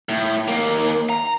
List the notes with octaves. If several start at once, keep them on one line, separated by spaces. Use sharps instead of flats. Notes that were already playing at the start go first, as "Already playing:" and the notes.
A2
D#2 A#3
A#5